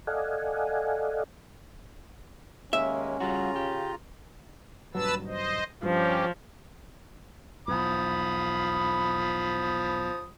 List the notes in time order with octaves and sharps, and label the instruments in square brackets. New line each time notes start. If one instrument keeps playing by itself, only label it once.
[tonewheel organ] A4 D5 D#5 F5 F#5 G#5
[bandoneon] D#2 G#3 A#3 [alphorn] C#4 [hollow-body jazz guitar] E5
[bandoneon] C#3 F4 A#5 [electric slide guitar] G3 F#4
[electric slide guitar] G4
[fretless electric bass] D#1 G2 F#3 [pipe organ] B4 A5 E6
[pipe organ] C5 D#5
[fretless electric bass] G2 [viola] F3 [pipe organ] C#4 G4
[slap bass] B1 E2 [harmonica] F3 B5 D#6